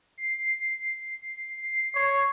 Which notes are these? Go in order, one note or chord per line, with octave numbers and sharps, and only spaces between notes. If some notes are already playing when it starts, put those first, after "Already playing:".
C7
C#5